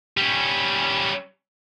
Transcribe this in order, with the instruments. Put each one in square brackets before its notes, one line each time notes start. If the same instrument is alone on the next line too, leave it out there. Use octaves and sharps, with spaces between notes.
[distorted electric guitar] G3 C#4